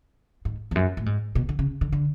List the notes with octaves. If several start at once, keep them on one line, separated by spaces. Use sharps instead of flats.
G#2
E2
F#2
A2
G#2
B2
D3
C#3
D3
D3